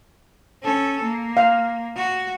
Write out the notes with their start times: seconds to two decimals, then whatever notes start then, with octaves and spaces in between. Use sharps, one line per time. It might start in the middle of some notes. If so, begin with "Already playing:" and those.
0.63 C#4 A4
1.02 A#3
1.37 F5
1.96 F#4